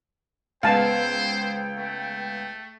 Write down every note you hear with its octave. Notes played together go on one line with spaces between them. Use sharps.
C#2 B3 C5 F5 G5 A5
A3